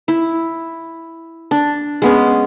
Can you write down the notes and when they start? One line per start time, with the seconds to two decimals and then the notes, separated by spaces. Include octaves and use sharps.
0.08 E4
1.51 D4
2.02 G#3 B3 C#4